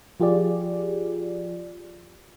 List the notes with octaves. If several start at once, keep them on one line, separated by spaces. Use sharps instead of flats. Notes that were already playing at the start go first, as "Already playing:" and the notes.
F3 F4 G4 G#4 D5